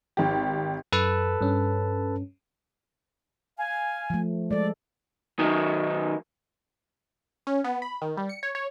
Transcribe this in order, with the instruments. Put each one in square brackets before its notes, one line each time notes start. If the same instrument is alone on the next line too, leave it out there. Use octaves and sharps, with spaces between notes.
[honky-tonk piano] G#1 G4
[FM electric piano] F#2 [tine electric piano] A4 B4 A5
[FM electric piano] G2 C#4
[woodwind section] F5 G#5
[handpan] F3 A3
[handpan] G#3 A4 [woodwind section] D5
[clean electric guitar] D#3 F#3 D#4
[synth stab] C#4
B3
B5
D#3
G3
C#7
C#5
C#5